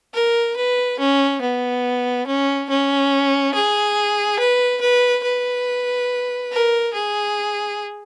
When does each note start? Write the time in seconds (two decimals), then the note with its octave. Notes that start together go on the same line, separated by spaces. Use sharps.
0.14 A#4
0.56 B4
0.99 C#4
1.41 B3
2.26 C#4
2.69 C#4
3.54 G#4
4.39 B4
4.81 B4
5.23 B4
6.52 A#4
6.94 G#4